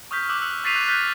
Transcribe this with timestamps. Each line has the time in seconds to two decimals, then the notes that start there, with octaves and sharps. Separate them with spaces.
0.11 C#6 D#6 F6 G6 B6
0.29 D6 E6 F#6
0.42 E6
0.64 C#6 A6 B6 C7 D#7 F7
0.75 F#6
0.88 F6 G6 A6 B6